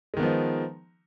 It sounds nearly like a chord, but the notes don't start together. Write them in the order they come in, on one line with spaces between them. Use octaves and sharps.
G#3 D#3 B3 F3 D#4